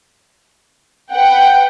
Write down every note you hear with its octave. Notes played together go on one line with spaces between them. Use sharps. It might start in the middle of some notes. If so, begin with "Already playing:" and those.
B4 F#5 G5